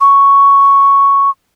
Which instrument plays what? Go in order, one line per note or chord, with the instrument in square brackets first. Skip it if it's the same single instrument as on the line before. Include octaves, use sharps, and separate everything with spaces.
[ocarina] C#6